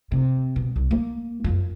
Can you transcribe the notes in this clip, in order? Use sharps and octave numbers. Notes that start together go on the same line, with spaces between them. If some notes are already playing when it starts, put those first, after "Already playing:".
C3
B2
C2
A#3
F#2 F4